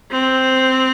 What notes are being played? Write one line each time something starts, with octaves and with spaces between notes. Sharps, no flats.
C4